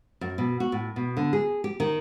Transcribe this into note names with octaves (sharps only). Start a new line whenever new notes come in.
F#2
B2
F#4
A2
B2
D3
G#4
G4
D#3